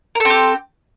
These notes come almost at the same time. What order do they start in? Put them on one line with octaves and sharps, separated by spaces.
A#4 A4 C4 G4